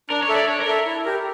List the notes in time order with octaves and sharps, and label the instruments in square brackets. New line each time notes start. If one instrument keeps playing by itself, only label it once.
[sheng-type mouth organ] D4 [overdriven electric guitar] A#4
[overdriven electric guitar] C#5
[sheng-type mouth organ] A4 E5
[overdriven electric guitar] D5
[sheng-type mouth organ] D4 [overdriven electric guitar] C#5
[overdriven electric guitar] A#4
[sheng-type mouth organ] A4 E5
E4
G4 A#4